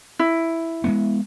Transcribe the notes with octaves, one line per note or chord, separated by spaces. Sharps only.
E4
G#3 A#3 B3